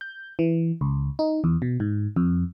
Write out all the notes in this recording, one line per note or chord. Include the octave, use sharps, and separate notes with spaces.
G6
E3
C#2
D#4
E2
B2
G#2
F2